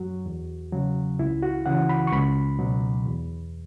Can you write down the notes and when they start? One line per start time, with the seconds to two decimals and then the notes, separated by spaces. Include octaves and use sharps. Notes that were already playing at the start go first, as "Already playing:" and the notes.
Already playing: F#2 F#3 F#4
0.26 E2
0.72 C#3 F#3
1.19 C#2 E4
1.43 F#4
1.66 C#3 E3 F#5
1.89 B5
2.07 C#6
2.13 C#2 B5
2.59 B2 F#3
3.06 E2